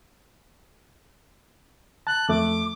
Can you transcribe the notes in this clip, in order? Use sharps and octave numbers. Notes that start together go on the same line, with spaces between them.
A5 F#6
F2 A3 D6